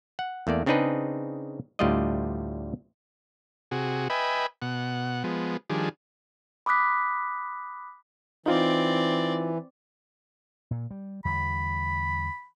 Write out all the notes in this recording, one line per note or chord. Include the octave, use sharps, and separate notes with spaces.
F#5
E2 A3 A#3 D5
C#3 C4 D4 D#4 G#4 B4
D2 A2 G3 F4 D5 D#5
C3 F#4 G#4
B4 D#5 E5 G5 G#5 B5
B2 F#5
F3 G#3 B3
D#3 F3 G3 D4 G#4
B5 D6 D#6 F#6 B6
E3 C4 D#4 F4 D5
A#2
G3
E2 D3 G3 B5